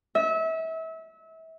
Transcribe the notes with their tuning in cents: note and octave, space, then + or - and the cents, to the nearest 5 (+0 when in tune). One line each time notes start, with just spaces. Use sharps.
E5 -30